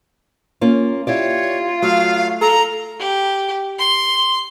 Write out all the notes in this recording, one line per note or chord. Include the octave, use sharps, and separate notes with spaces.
A#3 C#4 F4
E4 F4 G4 C#5 D5
F#3 A3 F5
A4 A#5
G4
C6